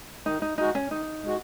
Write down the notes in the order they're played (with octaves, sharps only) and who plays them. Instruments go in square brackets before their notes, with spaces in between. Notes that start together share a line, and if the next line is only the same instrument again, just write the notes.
[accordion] D#3 [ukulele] D#4
[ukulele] D#4
[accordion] G#3 F#4 [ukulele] D#4
[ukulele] C#4
[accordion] D#3 [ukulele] D#4
[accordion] G#3 F#4